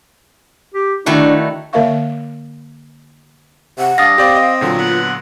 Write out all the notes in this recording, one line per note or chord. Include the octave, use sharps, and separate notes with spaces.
G4
D#3 A3 D4 E4 F#4
D3 A#3 A#4 E5 F5 C#6
C3 F#5
G3 D4 F5 D#6 A6 A#6
C4 G4 D5 F5
D#5
A#2 D3 F#3 F4
B3 B4 F#5